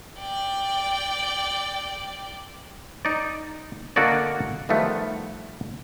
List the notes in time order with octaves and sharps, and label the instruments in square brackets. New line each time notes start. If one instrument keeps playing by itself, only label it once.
[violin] D5 G5
[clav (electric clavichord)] D#4 D5
D3 A#3 F#4 A4 D5 D#5
D#3 F3 G3 A3 B3